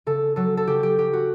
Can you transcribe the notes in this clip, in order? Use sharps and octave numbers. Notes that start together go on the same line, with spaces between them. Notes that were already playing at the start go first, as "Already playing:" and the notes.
C#3 A4
F#3 A4
A4
C#3 G4
G4
F#3 G4
F#4